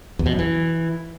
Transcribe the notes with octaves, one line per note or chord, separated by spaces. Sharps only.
E2
B2
F#2
E3